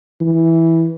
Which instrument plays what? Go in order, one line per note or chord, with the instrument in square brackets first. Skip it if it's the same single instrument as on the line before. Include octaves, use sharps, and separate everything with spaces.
[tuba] E3